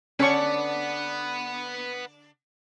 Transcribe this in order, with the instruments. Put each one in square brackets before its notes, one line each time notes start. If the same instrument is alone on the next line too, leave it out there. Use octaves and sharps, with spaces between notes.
[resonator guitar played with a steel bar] D3 D4 [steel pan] C#4 C#5 C#6 [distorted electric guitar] B4 F#5